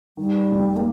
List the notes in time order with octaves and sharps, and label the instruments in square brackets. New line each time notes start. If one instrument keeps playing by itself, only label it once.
[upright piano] D#3 [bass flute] G3
[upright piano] F1
[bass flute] A#3